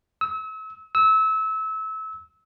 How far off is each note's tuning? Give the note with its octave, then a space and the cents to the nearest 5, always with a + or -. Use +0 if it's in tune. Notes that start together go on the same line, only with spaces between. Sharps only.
E6 -35
E6 -25